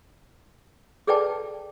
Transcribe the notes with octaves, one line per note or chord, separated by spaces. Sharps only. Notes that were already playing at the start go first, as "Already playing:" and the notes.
G#4 A4 B4 D5 G5 A5